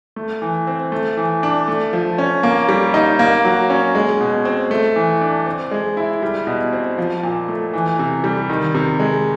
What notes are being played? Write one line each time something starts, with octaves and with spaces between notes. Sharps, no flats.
A3
E3
C4
A3
E3
D4
A3
F3
C#4
A#3
G3
D#4
A#3
F#3
C#4
G#3
B2
C4
A3
E3
D4
C4
G#3
E4
G3
B2
C4
F3
A#2
A3
E3
C3
G3
D#3
C3
G#3